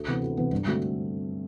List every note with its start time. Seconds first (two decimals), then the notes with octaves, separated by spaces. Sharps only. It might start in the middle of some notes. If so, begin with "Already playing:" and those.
Already playing: D2
0.08 C3 E3 B3
0.22 D2
0.37 C3 E3 B3
0.53 G2
0.66 D3 A3 C4 F#4